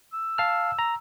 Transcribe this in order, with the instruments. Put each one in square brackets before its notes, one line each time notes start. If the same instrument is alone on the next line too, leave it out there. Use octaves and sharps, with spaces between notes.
[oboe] E6
[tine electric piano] F5 A5 F6
A#5